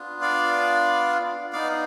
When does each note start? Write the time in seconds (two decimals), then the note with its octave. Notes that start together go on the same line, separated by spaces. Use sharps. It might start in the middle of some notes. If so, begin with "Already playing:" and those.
Already playing: B3 D4 F4
0.21 D5 F5
1.53 B3 D#4 D5 F5